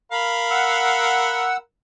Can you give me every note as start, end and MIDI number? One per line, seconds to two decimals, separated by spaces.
0.12 1.59 70
0.12 1.59 77
0.12 1.59 83
0.51 1.57 78
0.51 1.57 88